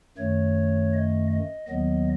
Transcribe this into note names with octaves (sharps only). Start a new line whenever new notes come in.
F#2 D#3 A3 C#5
D#5
D#5
D#2 D#3 F#3 B3 D#5